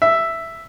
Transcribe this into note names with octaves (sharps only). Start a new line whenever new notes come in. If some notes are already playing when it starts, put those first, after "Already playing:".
E5